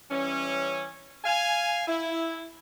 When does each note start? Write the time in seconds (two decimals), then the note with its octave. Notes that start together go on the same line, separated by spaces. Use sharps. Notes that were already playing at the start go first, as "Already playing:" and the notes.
0.11 E3 G3 C#4
1.25 F5 G#5
1.88 E4